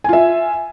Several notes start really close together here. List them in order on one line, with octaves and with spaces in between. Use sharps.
G#5 F4 E5